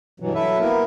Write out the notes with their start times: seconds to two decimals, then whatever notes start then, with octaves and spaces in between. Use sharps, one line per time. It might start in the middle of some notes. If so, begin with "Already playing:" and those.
0.20 G2 B2 E3 F#3
0.35 F#3 E4 A4 B4 E5
0.59 A#3 B3 E4 A#4